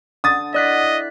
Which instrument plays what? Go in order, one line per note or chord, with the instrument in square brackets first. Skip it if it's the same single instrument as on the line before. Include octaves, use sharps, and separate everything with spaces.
[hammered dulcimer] D3 [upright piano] D#6 A6
[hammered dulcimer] E4 F#5 [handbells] D5 F#6 B6 [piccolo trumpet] D#5